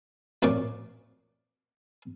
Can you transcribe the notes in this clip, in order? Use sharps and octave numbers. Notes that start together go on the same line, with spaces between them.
A1 F2 A#2 C#5 D5 D6